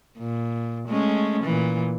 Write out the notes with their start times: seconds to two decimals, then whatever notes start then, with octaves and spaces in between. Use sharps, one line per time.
0.18 A#2
0.88 G#3 A3 C#4
1.43 A#2 E3